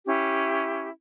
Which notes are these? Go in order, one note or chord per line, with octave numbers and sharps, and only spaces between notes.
C#4 E4 G4